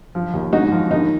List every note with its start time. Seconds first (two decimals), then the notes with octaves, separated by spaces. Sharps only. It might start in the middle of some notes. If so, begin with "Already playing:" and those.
0.15 F3
0.34 D#2
0.53 G#2 D#4 F#4
0.72 F3
0.90 D#2 D#4